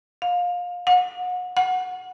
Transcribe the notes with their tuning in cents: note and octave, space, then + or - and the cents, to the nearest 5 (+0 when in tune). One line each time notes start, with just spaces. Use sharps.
F5 +25
F#5 -30
F#5 -5